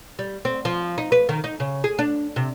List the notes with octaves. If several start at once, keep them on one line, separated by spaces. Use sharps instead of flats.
G3
C4
F3
D#4
B4
D#3
D#4
C#3
G#4
D4
C3